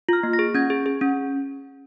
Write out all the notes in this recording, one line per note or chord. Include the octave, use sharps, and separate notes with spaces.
F4 F6
A#3
A#6
G#4
C#4 G#6
G#4
G#4
C#4